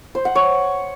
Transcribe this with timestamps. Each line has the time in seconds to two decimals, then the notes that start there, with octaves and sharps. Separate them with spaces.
0.15 C5
0.25 F#5
0.35 C#5